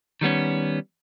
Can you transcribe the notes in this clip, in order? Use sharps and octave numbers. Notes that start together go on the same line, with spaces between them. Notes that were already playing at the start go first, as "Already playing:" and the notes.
D#3 G3 B3 C#4